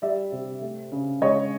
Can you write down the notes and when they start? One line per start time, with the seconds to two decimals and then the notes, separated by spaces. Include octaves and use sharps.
0.02 G3 D5 E5
0.32 C3
0.61 A3
0.92 C#3
1.21 G#3 C#5 D#5